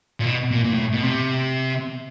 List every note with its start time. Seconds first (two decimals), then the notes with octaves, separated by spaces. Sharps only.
0.20 A#2
0.25 B2
0.51 A#2
0.64 A#2
0.74 A2
0.93 B2
1.03 C3